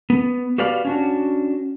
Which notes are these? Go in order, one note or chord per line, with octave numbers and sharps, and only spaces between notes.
B3
F#4 G4 B4 D5 F5
C#4 D4 F#4